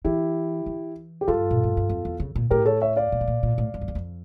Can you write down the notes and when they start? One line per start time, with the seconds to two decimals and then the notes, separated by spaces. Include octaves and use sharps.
0.05 E3 E4 G4
0.66 E3
1.21 G4
1.28 G2 F4 A4
1.51 A#2
1.64 A2
1.77 G2
1.89 F2
2.05 E2
2.20 C#3
2.36 A#2
2.50 A2 G4 A#4
2.66 A4 C#5
2.81 C#5 E5
2.96 D5 F5
3.12 A#2
3.21 A2
3.28 A#2
3.43 A#2
3.58 A2
3.74 G2
3.81 F2
3.88 E2
3.95 F2